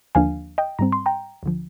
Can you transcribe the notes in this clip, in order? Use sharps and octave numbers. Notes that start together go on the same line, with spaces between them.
D#2 D3 F3 A#3 D4 F5 G#5
D#5 G5
G#2 G3 C4 A#5
C6
G5 A#5
D2 D3 F3